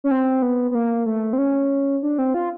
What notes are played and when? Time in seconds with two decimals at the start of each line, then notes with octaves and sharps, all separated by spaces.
0.04 C#4
0.11 C4
0.42 B3
0.71 B3
0.75 A#3
1.06 A3
1.33 C4
1.38 C#4
2.03 D4
2.18 C4
2.34 F4